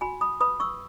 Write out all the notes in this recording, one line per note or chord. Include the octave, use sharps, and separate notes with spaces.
F#4 G#5 B5
B5 D#6
B4 B5 D#6
C#6 E6